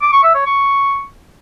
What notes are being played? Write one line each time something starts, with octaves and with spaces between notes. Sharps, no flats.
D6
C#6
E5
C#5
C#6